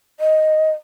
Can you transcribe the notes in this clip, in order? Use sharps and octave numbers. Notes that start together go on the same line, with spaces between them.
D#5